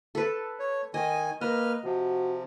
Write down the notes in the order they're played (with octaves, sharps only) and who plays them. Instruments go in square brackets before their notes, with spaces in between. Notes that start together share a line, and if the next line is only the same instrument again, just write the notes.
[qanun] A4 B4
[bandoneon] C#5
[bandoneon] D#3 G#5 [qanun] D#5
[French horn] A#3 [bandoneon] B4 F6 [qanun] D#5
[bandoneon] C3 F3 [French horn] F#4